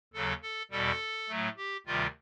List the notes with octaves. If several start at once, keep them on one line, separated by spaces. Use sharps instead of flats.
D#2 C#3 F#3 A4
A4
E2 B2 G3 A4
A2 F#3 A3
G4
D2 C3 D#3 G3 F4